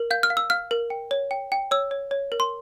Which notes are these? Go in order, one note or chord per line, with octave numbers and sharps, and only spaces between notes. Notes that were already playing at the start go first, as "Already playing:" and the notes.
Already playing: A#4
F5 G6
F6
F5
E6
F5 F6
A#4
G5
C#5
G5
G5
C#5 E6
C#5
C#5
A#4
C6